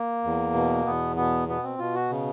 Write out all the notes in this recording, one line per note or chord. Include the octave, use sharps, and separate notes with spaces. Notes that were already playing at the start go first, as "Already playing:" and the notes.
Already playing: A#3
E2
B2
E2 B3
B2 B3
B2 B3
C4
B2 F4
F#4
C#3